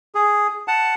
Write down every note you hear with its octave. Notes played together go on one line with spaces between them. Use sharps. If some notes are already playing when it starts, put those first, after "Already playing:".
G#4
F#5 A5